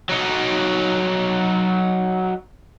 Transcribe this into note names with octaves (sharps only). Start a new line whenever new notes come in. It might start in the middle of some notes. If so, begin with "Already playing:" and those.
F#3 D#4